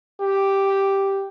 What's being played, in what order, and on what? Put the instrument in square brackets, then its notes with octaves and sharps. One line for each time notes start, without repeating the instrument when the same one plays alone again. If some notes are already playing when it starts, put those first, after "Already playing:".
[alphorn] G4